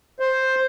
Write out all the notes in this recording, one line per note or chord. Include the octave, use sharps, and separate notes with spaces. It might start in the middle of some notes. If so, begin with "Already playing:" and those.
C5